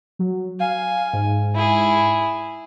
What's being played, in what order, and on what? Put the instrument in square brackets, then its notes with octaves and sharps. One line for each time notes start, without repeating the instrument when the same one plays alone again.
[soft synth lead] F#3
[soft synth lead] F5 [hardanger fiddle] G#5
[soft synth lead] G#2
[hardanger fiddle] E4 G#4